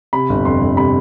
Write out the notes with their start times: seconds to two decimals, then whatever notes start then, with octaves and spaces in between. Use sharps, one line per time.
0.13 C3 B5
0.29 G1
0.45 F2 C6
0.61 G1
0.77 C3 B5